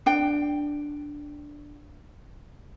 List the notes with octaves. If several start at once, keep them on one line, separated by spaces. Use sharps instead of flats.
D4 G5